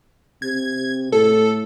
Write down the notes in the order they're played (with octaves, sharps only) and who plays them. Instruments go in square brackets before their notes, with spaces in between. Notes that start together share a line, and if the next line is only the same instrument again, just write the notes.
[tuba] C3 [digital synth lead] G#6
[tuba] A2 [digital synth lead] A4